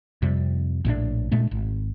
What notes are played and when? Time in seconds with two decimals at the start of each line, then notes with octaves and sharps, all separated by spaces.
0.22 F2 C3 G3
0.85 A#1 A2 C3 D4
1.31 A#2 G#3 A3 D4
1.51 G#1